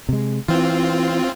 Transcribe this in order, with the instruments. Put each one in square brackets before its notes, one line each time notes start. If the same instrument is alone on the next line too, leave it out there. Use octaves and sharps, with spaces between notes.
[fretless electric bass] C3 G#3
[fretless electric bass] E3 [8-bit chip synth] C4 F4